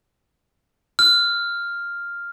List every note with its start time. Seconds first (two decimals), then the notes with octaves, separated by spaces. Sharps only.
0.99 F6